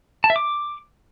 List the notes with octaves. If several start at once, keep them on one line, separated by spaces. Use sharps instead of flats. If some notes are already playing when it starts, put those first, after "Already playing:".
A5
E5
D6